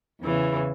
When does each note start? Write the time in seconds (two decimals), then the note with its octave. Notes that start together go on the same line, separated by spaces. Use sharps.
0.20 E2 C#3 E3